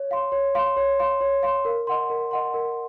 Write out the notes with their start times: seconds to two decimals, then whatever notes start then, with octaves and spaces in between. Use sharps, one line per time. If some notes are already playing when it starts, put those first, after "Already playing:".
Already playing: C#5
0.11 F5 C6
0.32 C#5
0.55 F5 C6
0.77 C#5
0.99 F5 C6
1.21 C#5
1.43 F5 C6
1.65 A#4
1.87 D#5 F#5 C6
2.10 A#4
2.31 D#5 F#5 C6
2.54 A#4